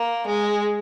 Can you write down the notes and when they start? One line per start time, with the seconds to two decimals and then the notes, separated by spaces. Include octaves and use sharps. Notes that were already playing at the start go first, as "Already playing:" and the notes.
Already playing: A#3
0.26 G#3